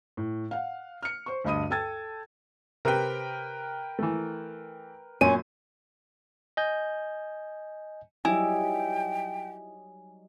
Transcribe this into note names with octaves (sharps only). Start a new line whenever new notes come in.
A2
F5 F#5
F6 C#7
C5 C#6
D2 G2 D#5 B5 D#6 D#7
A4 G5 A5 E6 G#6 A6
C3 A#4 B4 G5
E3 A3
F#2 A#2 C#4 C6 D#7
D#5 G#5 G6
F#3 G3 D#4 E4 G5 G#5